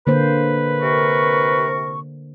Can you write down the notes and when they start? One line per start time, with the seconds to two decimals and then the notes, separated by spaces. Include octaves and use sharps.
0.07 D3 A#3 B4 C5
0.82 C3 A#4 C#6